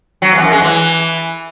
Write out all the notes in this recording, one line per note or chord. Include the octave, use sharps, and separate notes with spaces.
F#3
E2
F#2
G#3
E3